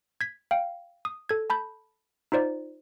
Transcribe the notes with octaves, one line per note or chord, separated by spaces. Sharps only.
G#6 B6
F5 G5
D#6
A4 G#6
A5 B5 G6
D#4 F4 C5 D5